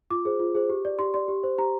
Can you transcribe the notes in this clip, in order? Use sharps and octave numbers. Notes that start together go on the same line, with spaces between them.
F4 D6
G#4 C5
F4
G#4 C5
G4
D5
G4 C6
D5 C6
G4
C5
G4 A#5